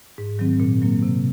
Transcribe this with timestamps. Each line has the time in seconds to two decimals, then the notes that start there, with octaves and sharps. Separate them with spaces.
0.18 G#2
0.39 D#3 F#3 C4
0.60 A#2
0.82 F#3 A#3
1.03 C3